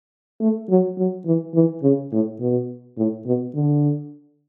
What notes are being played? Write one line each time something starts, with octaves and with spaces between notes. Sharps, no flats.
A3
F#3
F#3
E3
E3
C#3
A2
B2
A2
B2
D3